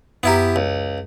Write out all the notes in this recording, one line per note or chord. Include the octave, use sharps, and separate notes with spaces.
F#2 B3 E4 G4 A#5
C#2